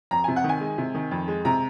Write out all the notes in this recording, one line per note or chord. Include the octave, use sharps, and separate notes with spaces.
F2 A#5
C3 G#5
F#5
D#3
G#5
G#3
C3
D#3
F2
G#3
C3 A#5